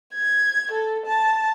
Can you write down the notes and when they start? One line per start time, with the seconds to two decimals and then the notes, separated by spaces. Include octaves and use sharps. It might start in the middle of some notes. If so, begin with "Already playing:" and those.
0.15 G#6
0.72 A4
1.06 A5